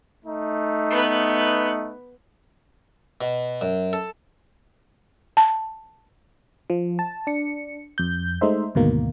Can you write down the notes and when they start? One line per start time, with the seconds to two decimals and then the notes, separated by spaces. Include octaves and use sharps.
0.25 A3 D#4
0.91 B3 B4
3.21 B2
3.61 F#2
3.93 A4
5.37 A5
6.70 F3
6.99 A5
7.27 D4 C#7
7.98 F2 G6
8.41 G#3 A3 D#4 C5 E5
8.75 D2 G#2 B2 D#3 A#3